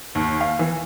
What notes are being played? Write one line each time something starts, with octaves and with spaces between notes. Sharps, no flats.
D#2
F5
E3